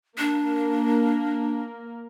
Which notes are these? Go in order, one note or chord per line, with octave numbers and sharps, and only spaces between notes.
A#3 D4 A#4